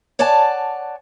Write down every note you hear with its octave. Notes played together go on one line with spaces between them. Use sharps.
C#5 D5 F#5 G#5 A5